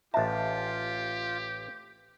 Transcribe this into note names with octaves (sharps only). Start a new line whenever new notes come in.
A1 F4 G4 D#5 E5 A5